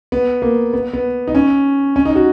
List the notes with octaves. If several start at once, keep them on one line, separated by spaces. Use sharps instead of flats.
B3
A#3
B3
B3
D#4
C#4
C#4
D#4
F#4